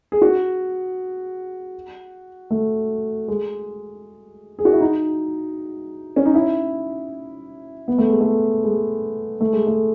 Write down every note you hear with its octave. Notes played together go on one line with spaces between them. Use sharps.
G#4
F#4
A3
G#3
G#4
F#4
E4
D#4
C#4
D#4
E4
B3
A3
G#3
A3
G#3
A3
G#3
A3